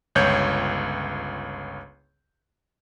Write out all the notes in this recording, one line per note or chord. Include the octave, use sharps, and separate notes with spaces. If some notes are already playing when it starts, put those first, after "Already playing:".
G1 C#2 C#5 G6